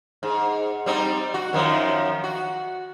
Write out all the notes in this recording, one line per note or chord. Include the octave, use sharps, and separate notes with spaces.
G#2
G3 C4 D#4
F#4
F#2 D#3 F3
F#4